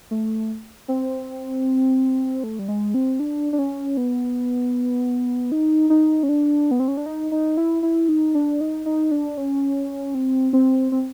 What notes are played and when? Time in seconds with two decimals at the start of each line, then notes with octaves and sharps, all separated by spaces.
0.11 A3
0.88 C4
2.44 A3
2.59 G3
2.68 G#3
2.94 C4
3.20 D4
3.53 D4
3.59 C#4
3.97 B3
5.52 D#4
5.90 D#4
6.23 C#4
6.29 D4
6.71 B3
6.80 C4
6.88 C#4
6.97 D4
7.06 D#4
7.32 D#4
7.57 E4
7.83 E4
8.09 D#4
8.35 D4
8.61 D#4
8.86 D#4
9.11 D4
9.37 C#4
10.15 C4
10.53 C4
10.92 C4